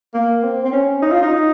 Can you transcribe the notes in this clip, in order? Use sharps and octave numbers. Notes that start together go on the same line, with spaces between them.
A#3
C4
C4
C#4
D#4
F4
D#4